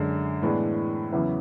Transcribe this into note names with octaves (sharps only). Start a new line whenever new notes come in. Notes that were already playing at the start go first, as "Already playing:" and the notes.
Already playing: F#2 D3 G#3
A2 E3 G#3 B3 D4
E2 C#3 F#3 B3 E4